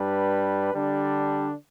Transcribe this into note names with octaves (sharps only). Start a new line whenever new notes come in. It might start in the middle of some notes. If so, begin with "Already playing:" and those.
Already playing: G2 G3 D4 B4
D3 G3 D4